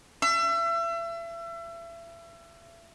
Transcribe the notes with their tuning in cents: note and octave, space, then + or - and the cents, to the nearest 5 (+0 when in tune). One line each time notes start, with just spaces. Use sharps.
E5 +35